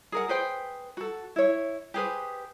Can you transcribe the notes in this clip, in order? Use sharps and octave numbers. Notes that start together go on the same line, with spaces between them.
G#4 A#4 F#5
G#4 B4 C5 G5
F#4 A4
E4 C#5
G4 G#4 B4 C5